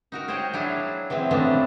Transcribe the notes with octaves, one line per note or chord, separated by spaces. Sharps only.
D#4 F#4 A#4
G#4 C5 C#5 F#5 G5
F#3 D4 E4 G#4
E3 F#3 G#3 C4
F2 E3 F#3 A3 B3 D4